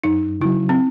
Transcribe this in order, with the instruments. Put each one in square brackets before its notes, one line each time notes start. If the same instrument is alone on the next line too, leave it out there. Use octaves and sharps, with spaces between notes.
[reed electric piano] F#2 [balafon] D#4
[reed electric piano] C#3 F#3 [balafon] E4
[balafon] C4